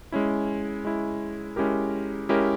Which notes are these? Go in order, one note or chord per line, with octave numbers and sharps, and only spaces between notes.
G#3 C#4 E4
G#3 C#4 E4
G#3 C#4 E4 G4 A#4
G#3 C#4 E4 G4 A#4